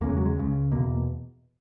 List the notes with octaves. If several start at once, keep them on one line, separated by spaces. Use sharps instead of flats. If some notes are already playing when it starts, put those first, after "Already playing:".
E2 C#3 A#3
G#3
F#3
G#3
C#2 C#3
E2 B2 A#3